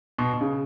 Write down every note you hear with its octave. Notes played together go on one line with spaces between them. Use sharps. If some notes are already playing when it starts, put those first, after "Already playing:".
B2
B2
C#3